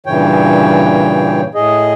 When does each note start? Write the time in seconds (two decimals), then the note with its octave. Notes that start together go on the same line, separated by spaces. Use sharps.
0.06 G2 A#2 C#3 E3 C#5 G5
1.55 A2 G#4 D#5